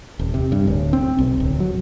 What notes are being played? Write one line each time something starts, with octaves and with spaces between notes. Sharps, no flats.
D#1
C3
G2
D1
C4
B1
D1
F#3